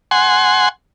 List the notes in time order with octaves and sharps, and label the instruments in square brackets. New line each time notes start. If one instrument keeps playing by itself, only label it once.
[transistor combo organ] F#5 G#5 C6